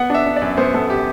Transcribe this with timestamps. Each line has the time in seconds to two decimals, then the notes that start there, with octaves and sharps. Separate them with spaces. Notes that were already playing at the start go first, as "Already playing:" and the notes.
Already playing: B3 F#5
0.10 D4 E5
0.26 D4
0.36 D5
0.41 F#2
0.57 B3 C5
0.74 B3 A4
0.90 G4